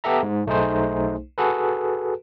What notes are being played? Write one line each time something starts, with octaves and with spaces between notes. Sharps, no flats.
B3 G4 A4 E5 A#5
G#2
B1 A3 D#4 G#4 C5
F#4 G#4 A4 B4